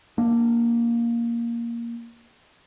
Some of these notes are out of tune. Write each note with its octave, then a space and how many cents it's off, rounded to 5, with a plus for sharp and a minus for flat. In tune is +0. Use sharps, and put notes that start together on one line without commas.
A#3 +5 D4 +20